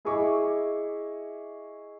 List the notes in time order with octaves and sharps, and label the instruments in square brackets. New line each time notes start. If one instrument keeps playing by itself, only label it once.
[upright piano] E4 G#4 D#5 E5 C#6 D6